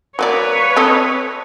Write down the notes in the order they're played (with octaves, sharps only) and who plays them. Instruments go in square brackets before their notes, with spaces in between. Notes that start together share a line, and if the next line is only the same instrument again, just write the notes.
[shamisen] F#3 A#3 D5 [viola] B4 C#5
[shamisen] C4 A4 D#5